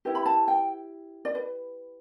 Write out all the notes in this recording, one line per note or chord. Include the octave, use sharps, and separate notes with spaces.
E4 G4 B4
B5
A5
G5
D5
B4